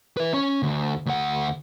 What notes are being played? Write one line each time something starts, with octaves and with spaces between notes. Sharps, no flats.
B4 E5
C#4 C#5
D2
D2 F#5